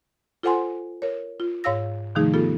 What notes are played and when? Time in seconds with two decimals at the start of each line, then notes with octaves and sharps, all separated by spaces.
0.43 F4 A4 C5 F#5 G#5 C6
1.02 A#4 C#5
1.40 F4
1.64 G#2 C#5 F5 E6 A#6
2.15 C3 D#3 F3 A3 D#4 G#4
2.34 B3 F4 G4 A4